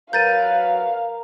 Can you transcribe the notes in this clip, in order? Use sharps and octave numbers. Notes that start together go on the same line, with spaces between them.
F#3 A#4 B4 F5 G6 A6 D#7